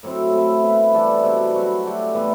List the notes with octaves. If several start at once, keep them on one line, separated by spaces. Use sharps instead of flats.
A2 F#3 C4 E4
A3 C4 E4
B3 E4 B4
E3 G3 D4 A4
B2 G3 C4
F#3 C4 F#4 B4
A3 D4 G4
A2 E3 B3 D4